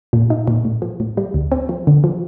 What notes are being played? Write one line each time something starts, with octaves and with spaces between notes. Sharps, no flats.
A#2
D#4
A#2
A2
F3
A2
G3
D2
C4
F3
D3
F3